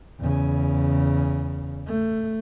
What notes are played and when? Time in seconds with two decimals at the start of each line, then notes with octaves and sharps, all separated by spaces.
0.20 E2 C#3
1.87 A3